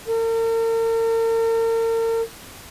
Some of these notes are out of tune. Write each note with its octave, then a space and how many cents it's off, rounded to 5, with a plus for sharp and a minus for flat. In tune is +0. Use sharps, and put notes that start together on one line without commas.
A#4 -40